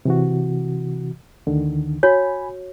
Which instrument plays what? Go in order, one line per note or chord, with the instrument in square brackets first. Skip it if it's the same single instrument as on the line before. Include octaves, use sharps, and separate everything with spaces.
[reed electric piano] C3 E3 F#4
D2 D3 D#3
[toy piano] F#4 C#5 [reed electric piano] G#5 B5